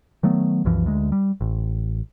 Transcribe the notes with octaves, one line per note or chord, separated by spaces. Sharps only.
D#3 F#3 A3 B3
C2 F#2 E3 F3
D2 G#3
G3
A1